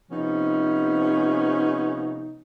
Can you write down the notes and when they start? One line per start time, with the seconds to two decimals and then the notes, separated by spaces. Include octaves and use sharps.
0.10 C3 F3 B3 C#4 D#4